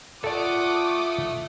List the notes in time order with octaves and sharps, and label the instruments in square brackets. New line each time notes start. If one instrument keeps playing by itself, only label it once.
[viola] F4 F#5 [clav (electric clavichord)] A4 D5 [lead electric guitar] E5 A5 [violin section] D6 D#6